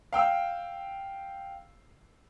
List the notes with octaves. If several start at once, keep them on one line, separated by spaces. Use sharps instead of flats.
F5 G5 E6